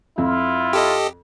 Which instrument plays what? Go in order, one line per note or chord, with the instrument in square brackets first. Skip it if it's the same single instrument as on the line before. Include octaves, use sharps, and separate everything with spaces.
[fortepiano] F2 [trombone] E4 [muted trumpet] F4
[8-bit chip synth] G4 A4 D#5